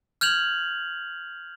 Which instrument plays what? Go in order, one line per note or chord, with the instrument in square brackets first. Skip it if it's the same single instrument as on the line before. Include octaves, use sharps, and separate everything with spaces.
[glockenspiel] F6 G6 G#6 F7 F#7